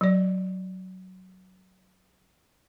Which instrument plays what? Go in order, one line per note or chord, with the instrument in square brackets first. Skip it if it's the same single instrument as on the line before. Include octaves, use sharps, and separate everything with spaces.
[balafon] F#3 D5